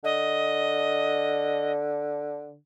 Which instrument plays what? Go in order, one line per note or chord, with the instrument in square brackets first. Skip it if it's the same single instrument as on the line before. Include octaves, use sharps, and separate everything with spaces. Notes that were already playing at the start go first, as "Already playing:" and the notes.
[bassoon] D3 [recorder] D#5